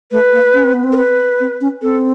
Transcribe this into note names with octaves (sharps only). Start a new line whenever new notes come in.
A3 B4
A#3
C#4
C4
B3
C4
A#4
B4
C4
C#4
C4 A4